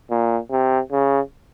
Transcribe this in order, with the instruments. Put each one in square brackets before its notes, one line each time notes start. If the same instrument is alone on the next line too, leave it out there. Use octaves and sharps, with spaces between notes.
[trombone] A#2
C3
C#3